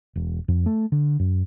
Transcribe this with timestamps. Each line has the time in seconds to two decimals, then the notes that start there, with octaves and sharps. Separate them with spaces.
0.16 E1
0.48 F2
0.66 A3
0.92 D3
1.19 F#2